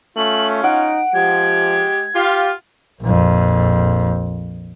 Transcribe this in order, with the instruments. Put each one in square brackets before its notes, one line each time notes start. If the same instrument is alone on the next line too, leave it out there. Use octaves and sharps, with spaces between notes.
[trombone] A3 [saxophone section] C#4 F4 [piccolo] F#7
[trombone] D#4 [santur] F#5 [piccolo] D7
[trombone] F3 [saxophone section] G#3 G4 [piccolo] G#6
[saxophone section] F4 [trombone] G4
[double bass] A#1 F2